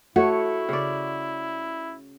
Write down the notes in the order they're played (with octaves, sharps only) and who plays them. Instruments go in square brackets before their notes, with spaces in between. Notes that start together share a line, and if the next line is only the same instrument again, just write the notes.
[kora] A3 C#5 [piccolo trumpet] E4 [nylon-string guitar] F#4
[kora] C#3 D5